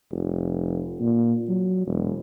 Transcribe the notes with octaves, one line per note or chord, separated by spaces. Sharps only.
F1
A#2
F#3
E1